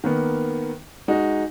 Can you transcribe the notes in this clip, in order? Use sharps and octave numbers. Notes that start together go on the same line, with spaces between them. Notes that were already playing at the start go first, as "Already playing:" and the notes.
D#3 A#3 B3
G#3 D#4 F#4